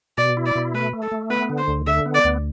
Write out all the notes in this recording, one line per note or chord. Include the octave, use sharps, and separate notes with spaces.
B2 D5
E4
D5
B2
A3 B4
A3
A4
A3
B3 B4
D3
C5
D2
D3 E5
B3
D5
D2